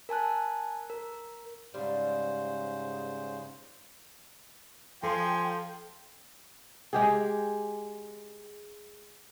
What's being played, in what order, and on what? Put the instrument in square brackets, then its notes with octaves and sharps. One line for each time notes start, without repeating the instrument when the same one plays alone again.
[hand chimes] A#4 G#5 A5 F#6
A#4
[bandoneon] G#2 C#3 C5 [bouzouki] G3
[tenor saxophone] F3 [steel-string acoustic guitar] A4 [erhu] G5 [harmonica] G#5 C6
[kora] G#3 G4 G#4